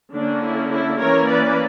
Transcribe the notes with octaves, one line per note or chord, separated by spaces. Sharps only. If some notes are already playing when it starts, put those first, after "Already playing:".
D3 A#3 C#4 D4
E4
E4
E3 A#3 C#4 A#4 C#5
B4 D5